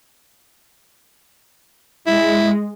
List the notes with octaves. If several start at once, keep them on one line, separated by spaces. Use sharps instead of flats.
G#3 E4